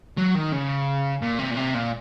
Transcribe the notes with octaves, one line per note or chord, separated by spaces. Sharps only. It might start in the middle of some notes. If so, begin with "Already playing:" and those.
F#3
D#3
C#3
A#2
C3
A#2
C3
A#2